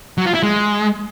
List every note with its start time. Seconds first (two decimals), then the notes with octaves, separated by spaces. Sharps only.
0.18 F#3
0.26 F4
0.34 E4
0.43 G#3